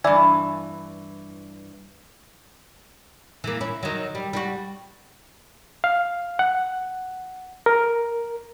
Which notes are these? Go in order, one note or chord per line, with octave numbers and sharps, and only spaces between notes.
G2 E3 D5 E5 G#5
E3 A#3
C#4 E4
D#3 F#3
G3
G3 E4 F#4
F5
F#5
A#4